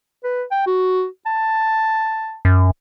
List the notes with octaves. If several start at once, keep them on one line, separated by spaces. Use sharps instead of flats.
B4
G5
F#4
A5
F#2